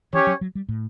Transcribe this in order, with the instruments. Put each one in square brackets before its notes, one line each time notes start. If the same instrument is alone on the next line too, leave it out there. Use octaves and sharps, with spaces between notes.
[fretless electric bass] E3 [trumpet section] C#4 G4 C#5
[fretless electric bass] F#3
F#3
G3
A2